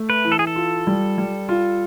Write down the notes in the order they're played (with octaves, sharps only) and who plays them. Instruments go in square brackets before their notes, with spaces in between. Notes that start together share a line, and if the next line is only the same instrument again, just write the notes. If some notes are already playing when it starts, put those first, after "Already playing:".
Already playing: [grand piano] A3
[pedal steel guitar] B4
[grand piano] E3
[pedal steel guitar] A4
G#4
A4
[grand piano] F4
G3
G3
F4